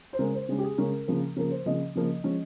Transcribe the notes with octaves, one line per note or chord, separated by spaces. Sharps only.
C5
C#3 G#3 C#4 A#4
C5
C#3 G#3 C#4 G#4
G4
G#4
C#3 G#3 C#4 A#4
C#3 F3 A#3
C#3 F3 A#3 A#4
C5
C#3 F3 A#3 D#5
C#3 F3 A#3
F3 G#3 C#4